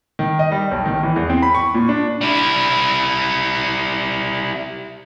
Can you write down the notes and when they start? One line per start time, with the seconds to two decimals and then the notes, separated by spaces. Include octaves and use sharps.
0.19 D#3
0.39 D#5
0.52 G3
0.71 B1
0.86 D#3
1.03 E3
1.16 E2
1.29 C4
1.42 B5
1.55 C#6
1.74 A#2
1.89 D4
2.21 G3 E4